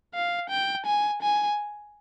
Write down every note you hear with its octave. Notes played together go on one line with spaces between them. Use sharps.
F5
G5
G#5
G#5